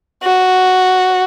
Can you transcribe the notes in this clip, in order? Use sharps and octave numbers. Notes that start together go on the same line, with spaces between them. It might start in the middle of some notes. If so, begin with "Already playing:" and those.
F#4